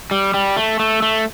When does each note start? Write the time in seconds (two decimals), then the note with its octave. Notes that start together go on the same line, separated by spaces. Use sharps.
0.11 G3
0.34 G3
0.57 A3
0.79 A3
1.02 A3